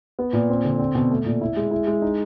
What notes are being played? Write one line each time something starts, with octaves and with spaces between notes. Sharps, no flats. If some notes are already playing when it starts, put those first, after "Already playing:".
B3
A#2
C4
D3
C4
B2
A3
A#2
E4
G#3
E4
G#3
D#4